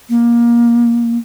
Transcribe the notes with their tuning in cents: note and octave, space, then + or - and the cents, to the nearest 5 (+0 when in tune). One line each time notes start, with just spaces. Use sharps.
A#3 +20